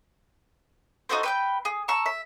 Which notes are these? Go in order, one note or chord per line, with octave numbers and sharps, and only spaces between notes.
D#4 F#4 A4 C5
B4 G5 G6
G#4
A5 A#5 C#6 E6
E5